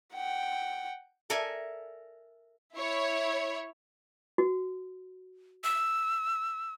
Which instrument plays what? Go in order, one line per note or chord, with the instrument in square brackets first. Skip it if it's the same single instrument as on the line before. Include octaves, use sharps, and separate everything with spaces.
[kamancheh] F#5 G5
[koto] A4 A#4 D5 E5 G#5
[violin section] E4 C#5
[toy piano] F#4
[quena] E6